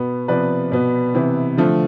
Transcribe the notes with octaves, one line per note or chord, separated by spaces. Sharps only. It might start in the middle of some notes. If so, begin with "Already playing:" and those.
Already playing: B2 B3
C3 F3 B3 B4 D5
B2 B3
C3 E3 B3
D3 F3 A3